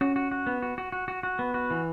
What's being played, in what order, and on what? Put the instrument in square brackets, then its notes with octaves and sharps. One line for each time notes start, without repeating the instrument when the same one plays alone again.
[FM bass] C#4 [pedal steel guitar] F#4
[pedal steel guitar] F#4
F#4
B3
F#4
F#4
F#4
F#4
F#4
B3
F#4
E3